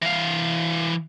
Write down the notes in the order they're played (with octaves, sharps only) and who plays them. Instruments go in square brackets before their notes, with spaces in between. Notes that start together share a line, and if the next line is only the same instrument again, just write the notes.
[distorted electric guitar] E3 F5